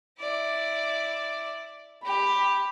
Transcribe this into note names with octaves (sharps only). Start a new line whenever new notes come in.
E4 D5
G4 B5